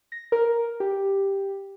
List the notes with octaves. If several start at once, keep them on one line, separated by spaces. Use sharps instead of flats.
A#6
A#4
G4